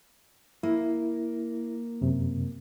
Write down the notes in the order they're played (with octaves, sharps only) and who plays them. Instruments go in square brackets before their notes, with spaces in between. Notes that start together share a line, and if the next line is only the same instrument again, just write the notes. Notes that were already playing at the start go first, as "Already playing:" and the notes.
[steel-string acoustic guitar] A#3 [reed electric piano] E4
[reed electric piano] F#2 C3